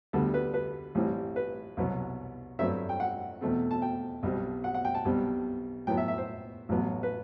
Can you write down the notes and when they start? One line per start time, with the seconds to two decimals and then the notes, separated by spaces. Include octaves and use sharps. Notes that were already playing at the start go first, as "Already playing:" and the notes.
0.13 D2 D3 G3 B3 A4
0.34 B4
0.54 B4
0.95 A1 A2 G3 C4
1.36 B4
1.77 C2 B2 F#3 B3
2.59 G2 F#3 A3 C4 E5
2.89 G5
3.00 F#5
3.41 E2 B2 A3 C4
3.71 A5
3.82 G5
4.23 B1 B2 G3 C4
4.64 F#5
4.74 F#5
4.85 G5
4.94 A5
5.05 B1 B2 G3 C4
5.87 A2 F#3 B3 G5
5.97 E5
6.08 E5
6.18 C5
6.69 A1 A2 F#3 B3
7.03 B4